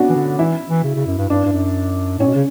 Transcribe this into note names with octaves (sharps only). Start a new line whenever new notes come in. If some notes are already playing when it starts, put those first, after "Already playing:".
Already playing: B3 C#4 D4 F#4
E3
D3
E3 E4
E3
C#3
C#3
F#2
G2
G2 D4
G2
F#2
A2 C#4
B2
C#3